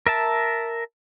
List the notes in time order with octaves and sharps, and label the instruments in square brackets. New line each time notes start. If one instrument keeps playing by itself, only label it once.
[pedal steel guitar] A#4 E5 A5